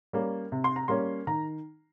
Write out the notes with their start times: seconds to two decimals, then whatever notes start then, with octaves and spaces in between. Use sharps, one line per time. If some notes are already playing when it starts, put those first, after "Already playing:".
0.13 G3 A#3 C#4
0.52 C3
0.64 C6
0.76 A#5
0.88 G3 A#3 C#4 C6
1.27 D#3 A#5